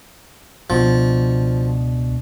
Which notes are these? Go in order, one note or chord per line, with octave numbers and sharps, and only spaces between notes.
C#2 B2 F3 D4